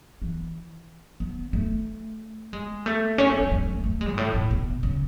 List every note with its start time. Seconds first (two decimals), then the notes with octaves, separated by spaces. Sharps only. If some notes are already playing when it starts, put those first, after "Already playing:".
0.22 E3
1.20 B3
1.53 A3
2.53 G#3
2.86 A3
3.18 C#4
3.30 A3
3.40 G#3
3.52 G#3
3.62 G#3
3.73 A3
3.84 A3
4.01 G#3
4.12 G#2
4.18 A2
4.34 A2
4.51 B2
4.83 C#3